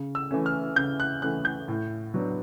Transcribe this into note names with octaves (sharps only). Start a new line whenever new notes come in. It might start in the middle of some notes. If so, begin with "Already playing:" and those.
Already playing: C#3
E6
E3 A3 C#4
F6
C#3 G6
F#6
E3 A3 C#4 F#6
G6
A2
F#3 B3 D4